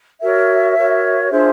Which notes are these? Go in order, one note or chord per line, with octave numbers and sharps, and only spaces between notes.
F#4 A#4 C#5 E5
F#4 A#4 C#5
D4 F4 G#4 C5 E5